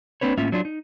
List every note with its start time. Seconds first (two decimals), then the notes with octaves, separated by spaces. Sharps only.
0.21 A#3 C4 D4 B4 C#5
0.38 A2 A#3 C#4 F4 E5
0.52 F#3 D4 F4
0.65 D#4